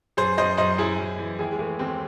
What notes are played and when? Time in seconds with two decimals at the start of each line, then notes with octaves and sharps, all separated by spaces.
0.17 F#2 G#4 C5
0.38 F#2 C5 D#5
0.58 F#2 C5 D#5
0.78 F#2 E4 G#4
0.99 F#2
1.18 E3
1.39 D#2 E4 G#4
1.52 G#3
1.59 E3 A3
1.79 D#2 G#3 C4